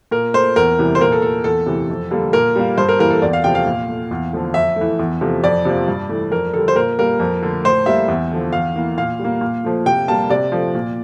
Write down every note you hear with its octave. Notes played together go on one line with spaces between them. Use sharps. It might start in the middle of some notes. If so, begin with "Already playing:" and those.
A#2 A#4
A3 C5
E2 A#4
C3 E3 G3
C5
A#2 A#4
A4
A3 A4
E2 A4
C3 E3 A3
F2
D3 G3 A#3
A#2 A#4
G3 A#3
G2 C5
A#4
E3 G3 A#3 A#4
A4
E2 D5
F5
C3 F3 A3 G5
F5
A#2
A3
E2
D3 F3 A3
F2 E5
E3 A3
E2
C3 F3 A3
F2 D5
C3 F3 A#3
G2
E3 A3
F2 A#4
D3 G3 A4
C5
A#2 A#4
G3 A#3 A#4
F2
D3 A3
A2 C5
G3 A#3 E5
E2
D3 F3
E2 F5
E3 A#3
A#2 F5
G3
A#3
A#2
F3 A3
C3 G5
G3 A#3 A5
C3 D5
F3 A3
A#2